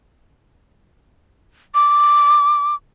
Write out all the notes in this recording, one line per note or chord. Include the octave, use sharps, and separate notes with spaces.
D6